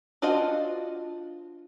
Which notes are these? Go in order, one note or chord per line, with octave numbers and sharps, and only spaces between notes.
D4 F4 F#4 C5 D#5